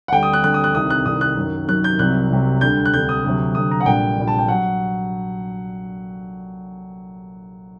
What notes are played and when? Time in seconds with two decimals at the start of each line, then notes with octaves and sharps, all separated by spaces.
0.08 F#5
0.12 D2 D3 G3 G5
0.23 D#6
0.33 F#6
0.44 D2 D3 G3 F#6
0.54 D#6
0.64 F#6
0.75 C2 C3 D#3 D#6
0.90 F#6
1.06 C2 C3 D#3 D#6
1.21 F#6
1.37 F#2 D#3 F#3
1.68 F#2 D#3 F#3 F#6
1.84 G6
1.99 C2 C3 F#3 F#6
2.30 C2 C3 F#3
2.61 D2 D3 G3 G6
2.86 F#6
2.94 D2 D3 G3 G6
3.09 D#6
3.24 D2 C3 F#3
3.55 D2 C3 F#3 D#6
3.71 A#5
3.81 F#5
3.86 A#1 A#2 G3 G5
4.17 A#1 A#2 G3
4.28 A5
4.39 G5
4.48 F#3 F#5